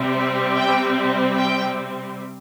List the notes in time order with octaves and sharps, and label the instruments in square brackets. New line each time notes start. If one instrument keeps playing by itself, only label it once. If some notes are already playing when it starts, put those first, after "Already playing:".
Already playing: [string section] C3 G3 C4
G5
G5